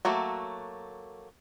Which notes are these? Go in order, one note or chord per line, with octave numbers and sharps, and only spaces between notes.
F#3 A3 A#3 F#4